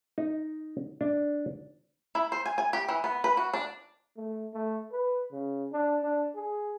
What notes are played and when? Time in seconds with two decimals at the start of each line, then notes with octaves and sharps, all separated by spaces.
0.18 D#4
1.01 D4
2.15 E4
2.32 C5
2.46 G#5
2.58 G#5
2.73 G4
2.89 E3
3.04 B3
3.24 B4
3.37 F#4
3.54 D4
4.17 A3
4.54 A3
4.92 B4
5.32 C#3
5.72 D4
6.03 D4
6.35 G#4